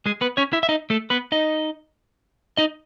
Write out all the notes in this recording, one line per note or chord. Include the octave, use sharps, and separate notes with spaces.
G#3 G#4
B3 B4
C#4 C#5
E4 E5
E5
D#4 D#5
A3 A4
B3 B4
D#4 D#5
D#4 D#5